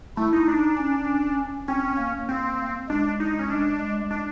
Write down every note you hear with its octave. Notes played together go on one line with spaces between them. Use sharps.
A3 E4
D#4
D4 D#4
C#4
C4 C#4
A#3
C4
G#3 D4
D#4
C#4
D4
G#3
D4